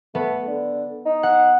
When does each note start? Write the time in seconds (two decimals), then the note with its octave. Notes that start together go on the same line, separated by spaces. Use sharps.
0.15 A3 B3
0.47 D3
1.06 D#4
1.23 F#5